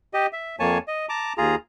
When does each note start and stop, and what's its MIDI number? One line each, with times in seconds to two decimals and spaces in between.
0.14 0.26 67
0.14 0.26 75
0.33 0.56 76
0.59 0.78 41
0.59 0.78 58
0.59 0.78 73
0.59 0.78 80
0.59 0.78 81
0.88 1.06 75
1.09 1.33 81
1.09 1.33 82
1.09 1.33 86
1.38 1.55 39
1.38 1.55 65
1.38 1.55 68
1.38 1.55 82